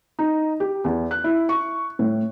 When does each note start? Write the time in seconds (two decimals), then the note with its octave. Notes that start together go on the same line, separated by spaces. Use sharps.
0.19 D#4
0.60 G4
0.84 E2
1.11 F#6
1.24 E4
1.49 C#6
1.99 A2